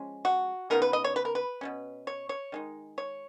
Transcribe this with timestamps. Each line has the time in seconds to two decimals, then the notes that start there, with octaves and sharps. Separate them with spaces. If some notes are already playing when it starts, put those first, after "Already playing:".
Already playing: F3 G#3 C#4
0.25 F#4
0.70 C#3 F3 B3 D#4 A#4
0.82 B4
0.93 D#5
1.04 C#5
1.16 B4
1.25 A#4
1.35 B4
1.61 B2 G#3 C#4
2.07 C#5
2.29 C#5
2.52 D#3 G#3 D#4
2.98 C#5